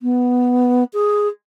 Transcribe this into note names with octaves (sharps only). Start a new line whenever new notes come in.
B3
G#4